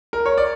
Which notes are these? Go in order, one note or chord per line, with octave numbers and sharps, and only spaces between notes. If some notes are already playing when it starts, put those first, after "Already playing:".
A#4
C#5
D5